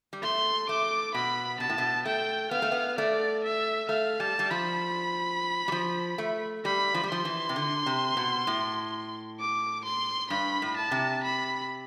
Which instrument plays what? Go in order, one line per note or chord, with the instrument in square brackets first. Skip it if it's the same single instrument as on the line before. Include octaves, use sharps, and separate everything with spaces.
[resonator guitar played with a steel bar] G3
[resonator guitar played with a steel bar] A3 [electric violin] C6
[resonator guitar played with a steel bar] A3 [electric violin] D6
[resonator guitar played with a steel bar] B2 [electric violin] B5
[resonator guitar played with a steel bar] B2 [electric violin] A5
[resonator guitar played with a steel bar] A2
B2
[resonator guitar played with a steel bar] A3 [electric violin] G5
[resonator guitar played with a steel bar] B3 [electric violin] F5
[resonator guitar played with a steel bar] A3
B3
[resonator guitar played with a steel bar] A3 [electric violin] D5
[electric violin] E5
[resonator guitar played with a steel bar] A3 [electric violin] F5
[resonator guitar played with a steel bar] G3 [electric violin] A5
[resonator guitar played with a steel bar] G3
[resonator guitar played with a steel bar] F3 [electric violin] B5
[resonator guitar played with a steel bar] G3
F3
A3
[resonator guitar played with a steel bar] G3 [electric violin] B5
[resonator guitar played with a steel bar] F3
G3
[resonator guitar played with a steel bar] F3 [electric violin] C6
[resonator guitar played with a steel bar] E3
C3
D3
C3
B2
A2
[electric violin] D6
C6
[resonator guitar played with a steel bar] G2 [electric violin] B5
[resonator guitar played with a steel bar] A2
[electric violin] A5
[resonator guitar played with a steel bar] C3
[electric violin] B5